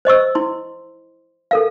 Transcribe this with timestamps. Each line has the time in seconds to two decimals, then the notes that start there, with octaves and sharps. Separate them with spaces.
0.05 C5 D#5 C#6 E6
0.35 E4 C6
1.51 A4 A#4 F5